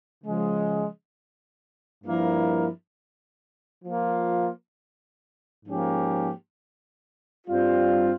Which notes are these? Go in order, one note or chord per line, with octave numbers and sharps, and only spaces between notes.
C#3 F3 G#3
G2 F3 A#3 E4 A#4
F3 A#3 F4
G#2 F3 A#3 C#4 G4
G2 G3 C4 F4